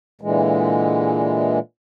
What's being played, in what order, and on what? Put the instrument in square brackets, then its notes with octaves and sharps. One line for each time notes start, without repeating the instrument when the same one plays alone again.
[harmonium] A#2 D3 E3 G#3